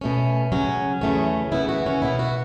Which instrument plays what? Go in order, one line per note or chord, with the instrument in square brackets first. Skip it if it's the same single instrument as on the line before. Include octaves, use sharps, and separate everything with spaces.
[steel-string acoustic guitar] B2 A3 C#4
C#3 F#3 C#4
E2 C#3 A3 C#4
C#3 E3 B3 E4
F#4
C#4
B2 B3 E4
F#4